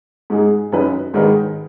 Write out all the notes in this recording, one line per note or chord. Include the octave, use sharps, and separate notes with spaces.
G#2 G#3 D#4 G#4
F#2 F#3 D#4 B4
G#2 D#3 G#3 D#4 B4